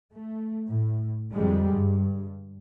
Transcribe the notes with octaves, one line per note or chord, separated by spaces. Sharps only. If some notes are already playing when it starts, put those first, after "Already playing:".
A3
A2
F2 D3 G3 G#3
G2